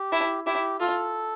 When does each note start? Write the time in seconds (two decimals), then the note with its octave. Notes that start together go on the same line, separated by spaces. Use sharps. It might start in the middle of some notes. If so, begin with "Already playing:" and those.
Already playing: G4
0.12 E4
0.46 E4 G4
0.80 F4 A4